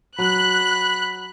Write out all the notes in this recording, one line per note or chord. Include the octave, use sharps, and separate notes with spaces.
F#3 B5 F#6